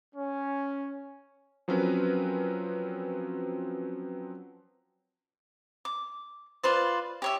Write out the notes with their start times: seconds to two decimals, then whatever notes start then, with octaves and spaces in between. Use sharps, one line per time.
0.15 C#4
1.68 F3 F#3 C4 C#4 A#4 B4
5.85 D6
6.63 F4 B4 C5 D5
7.22 G4 C#5 E5